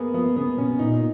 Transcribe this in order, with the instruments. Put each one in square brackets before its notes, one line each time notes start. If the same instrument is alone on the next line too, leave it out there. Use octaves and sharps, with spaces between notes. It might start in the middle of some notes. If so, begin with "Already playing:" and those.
Already playing: [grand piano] A#3 B3 G#4
[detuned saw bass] F3 [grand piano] B3
[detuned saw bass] C#3 [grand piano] B3
[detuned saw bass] B2 [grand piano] C#4
[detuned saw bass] A#2 [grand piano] D#4